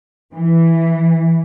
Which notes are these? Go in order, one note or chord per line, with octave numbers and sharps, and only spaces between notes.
E3